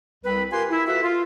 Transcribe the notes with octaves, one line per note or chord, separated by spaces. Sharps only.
C2 C4 B4
F4 G4 A#4 B4 G#5 C6
E4
F4 F#4 A4 B4 E5
F4